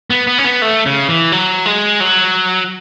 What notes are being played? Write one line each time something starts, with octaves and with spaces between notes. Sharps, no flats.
B3
B3
C#4
B3
A3
C#3
E3
F#3
G#3
F#3